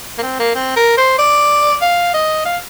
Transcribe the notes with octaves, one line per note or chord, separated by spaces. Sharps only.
A#3
C4
A#3
C4
A#4
C5
D5
F5
D#5
F5